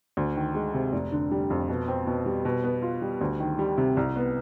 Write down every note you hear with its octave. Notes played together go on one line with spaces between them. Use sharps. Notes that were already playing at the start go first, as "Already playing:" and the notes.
D2
D#3
G#3
C3
F1
D3
G3
F2
B2
C4
B2
G3
B2
B3
F4
G3
D2
D#3
G3
C3
C2
B3